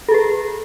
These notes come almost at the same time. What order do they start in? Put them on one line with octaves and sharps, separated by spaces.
A4 G#4 B4